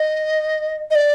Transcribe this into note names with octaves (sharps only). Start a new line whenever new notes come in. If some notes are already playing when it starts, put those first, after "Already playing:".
Already playing: D#5
D#5
D5